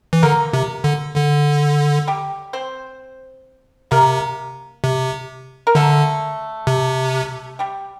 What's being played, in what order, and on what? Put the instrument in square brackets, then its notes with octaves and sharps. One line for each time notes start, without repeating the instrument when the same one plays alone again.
[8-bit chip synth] E3
[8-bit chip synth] D3 [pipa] A#3 A#4
[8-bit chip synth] C3
D3
D3
[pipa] G3 G4
C4 C5
[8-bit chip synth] C3 [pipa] A#3 A#4
[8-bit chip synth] C3
[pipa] A#4
[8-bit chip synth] D3 [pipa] A3 A4
[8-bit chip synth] C3
[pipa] G3 G4